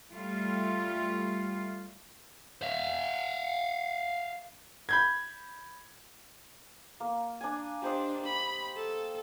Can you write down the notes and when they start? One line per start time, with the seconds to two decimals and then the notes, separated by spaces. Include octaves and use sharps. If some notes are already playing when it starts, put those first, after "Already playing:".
0.13 G3 A3 F4
2.63 E5 F5
4.89 B5 G6 G#6
7.00 A#3
7.41 D4 G#5
7.82 D4 G4 C5 D#5
8.26 B5
8.76 A4